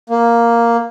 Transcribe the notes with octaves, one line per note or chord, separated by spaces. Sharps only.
A#3